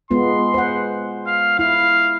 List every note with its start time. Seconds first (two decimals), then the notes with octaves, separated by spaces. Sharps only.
0.11 G#3 B3 F4 C6
0.54 C5 F#5
1.27 F5
1.59 E4 F5